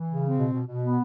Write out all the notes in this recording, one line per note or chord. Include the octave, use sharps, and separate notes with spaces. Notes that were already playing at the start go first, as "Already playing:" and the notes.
Already playing: E3
C#3
C4
B2
B2
B2
B3